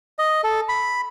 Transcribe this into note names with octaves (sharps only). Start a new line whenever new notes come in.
D#5
A4
B5